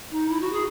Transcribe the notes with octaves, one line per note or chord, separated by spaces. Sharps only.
D#4
E4
F#4
G#4